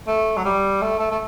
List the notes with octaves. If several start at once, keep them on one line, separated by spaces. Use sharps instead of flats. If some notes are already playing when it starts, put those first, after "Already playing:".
A3
F#3
G3
A3
A3
A3